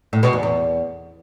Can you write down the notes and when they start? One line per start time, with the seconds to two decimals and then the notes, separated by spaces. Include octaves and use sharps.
0.13 A2
0.23 B2
0.33 E2
0.43 E2